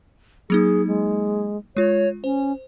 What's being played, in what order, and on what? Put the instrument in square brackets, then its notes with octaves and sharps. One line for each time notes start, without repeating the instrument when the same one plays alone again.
[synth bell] F#3 A#3 D#4 [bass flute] G#4
[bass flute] G#3
[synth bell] G#3 F4 [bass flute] C#5
[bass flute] C#4 [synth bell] C5